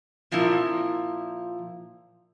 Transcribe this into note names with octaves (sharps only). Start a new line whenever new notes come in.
A#2 F3 C4 E4 A#4